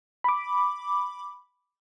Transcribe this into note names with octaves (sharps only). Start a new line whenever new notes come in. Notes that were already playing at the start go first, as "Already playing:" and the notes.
B5 D6